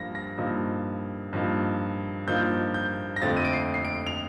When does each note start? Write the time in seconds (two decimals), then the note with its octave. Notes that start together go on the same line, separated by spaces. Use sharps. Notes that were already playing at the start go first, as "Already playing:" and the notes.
Already playing: G2 F3 A#3 A#6
0.15 A#6
0.38 G2 F3 A#3 D#4
1.33 G2 F3 A#3 D#4
2.27 G2 F3 A#3 D#4 G6
2.74 G6
3.16 A#6
3.22 F2 D3 A3 C4 F4 A6
3.37 D#7
3.45 D7
3.53 C7
3.74 C7
3.85 D7
4.07 F7